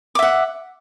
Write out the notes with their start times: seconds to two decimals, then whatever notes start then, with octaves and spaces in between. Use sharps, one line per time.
0.15 D6
0.19 E5
0.23 F#5